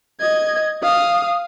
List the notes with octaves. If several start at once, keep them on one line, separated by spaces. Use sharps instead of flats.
D#5 G#6
F5 D#6